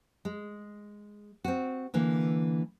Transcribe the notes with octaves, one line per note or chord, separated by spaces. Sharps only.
G#3
C4 F#4
D3 E3 A#3